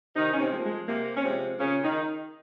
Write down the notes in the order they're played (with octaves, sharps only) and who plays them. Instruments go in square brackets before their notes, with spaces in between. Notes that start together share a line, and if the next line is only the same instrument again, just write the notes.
[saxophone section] C3 D#3 D#4
C#4
C3 C4
F3 G#3
A#3
G#3
C3 A#3
C#4
C3 F3 G#3 C4
A#2 C#3 C#4
D#3 D#4